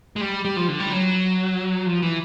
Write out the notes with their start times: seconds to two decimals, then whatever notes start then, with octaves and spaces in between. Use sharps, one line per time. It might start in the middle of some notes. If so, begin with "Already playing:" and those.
0.16 G#3
0.21 G3
0.45 G3
0.56 F3
0.68 D3
0.80 G3
0.92 F#3
1.86 F3
2.02 E3